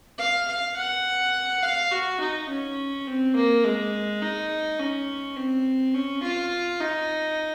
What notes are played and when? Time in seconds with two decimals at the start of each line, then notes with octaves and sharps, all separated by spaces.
0.18 F5
0.48 F5
0.76 F#5
1.62 F5
1.91 F#4
2.20 D#4
2.49 C#4
3.06 C4
3.35 A#3
3.64 G#3
4.22 D#4
4.79 C#4
5.36 C4
5.94 C#4
6.23 F4
6.80 D#4